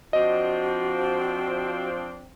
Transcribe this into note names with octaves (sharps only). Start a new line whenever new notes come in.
F3 C4 D4 F#4 D#5